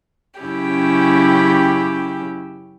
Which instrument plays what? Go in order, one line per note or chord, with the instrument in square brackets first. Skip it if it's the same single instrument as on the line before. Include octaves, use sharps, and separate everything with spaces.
[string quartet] F#2 C#3 C#4 E4 G4 G5